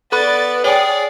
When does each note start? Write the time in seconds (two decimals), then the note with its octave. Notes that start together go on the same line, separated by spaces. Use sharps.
0.12 B3 A4 D5 B5 F#6 A6
0.64 G#4 C#5 D5 G5 G#5